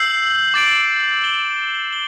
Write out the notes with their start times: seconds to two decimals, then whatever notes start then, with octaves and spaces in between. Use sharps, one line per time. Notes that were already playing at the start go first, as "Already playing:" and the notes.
Already playing: E6 G6 C7 F#7
0.54 D6 A6 D7 F#7
1.24 A6 E7 G7
1.93 G7